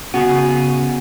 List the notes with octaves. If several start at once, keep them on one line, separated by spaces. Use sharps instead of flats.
C#3 B3 F#4 G#4